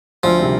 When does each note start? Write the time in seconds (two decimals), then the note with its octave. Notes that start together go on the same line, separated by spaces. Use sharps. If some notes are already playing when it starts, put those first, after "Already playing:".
0.23 D2 F3
0.39 C3 D#3 G3 C4